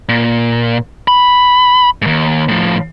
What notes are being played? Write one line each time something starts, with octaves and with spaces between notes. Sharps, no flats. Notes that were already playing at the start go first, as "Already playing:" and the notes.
A#2
B5
D#2 G#2
A2 F3